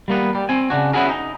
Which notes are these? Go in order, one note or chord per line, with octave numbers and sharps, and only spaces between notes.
G3 A#3 B3
G3
C4 G#5
C#3 D4 F#4
B3 C#4 E4 F#4 G#4 A#4
D#4